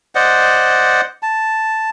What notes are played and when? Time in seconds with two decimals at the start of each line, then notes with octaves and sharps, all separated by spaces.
0.15 C5 D5 D#5 F#5
1.23 A5